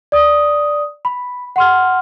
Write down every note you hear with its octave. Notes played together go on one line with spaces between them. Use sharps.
D5 D#6
B5
F#5 C6 F6